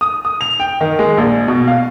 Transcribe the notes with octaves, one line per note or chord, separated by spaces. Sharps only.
D#6
D#6
F7
G5
D#3
G#3
A#1
B2
F5